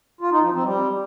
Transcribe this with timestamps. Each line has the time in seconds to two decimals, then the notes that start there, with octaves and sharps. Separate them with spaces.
0.21 F4
0.32 D#4
0.42 F3
0.53 C4
0.64 G3